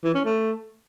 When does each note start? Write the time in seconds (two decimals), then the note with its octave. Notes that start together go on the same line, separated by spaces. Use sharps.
0.04 E3
0.14 C#4
0.25 A3